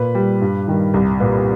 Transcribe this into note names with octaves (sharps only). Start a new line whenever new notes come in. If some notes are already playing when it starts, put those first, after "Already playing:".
Already playing: A#2 B4
G3
G2
D#3 G3
C2
A#2 G3 B4